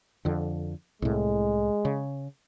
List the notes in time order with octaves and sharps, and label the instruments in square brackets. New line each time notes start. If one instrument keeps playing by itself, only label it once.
[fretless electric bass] F2 D3
[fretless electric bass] C2 A2 [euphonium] G#3
[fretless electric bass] C#3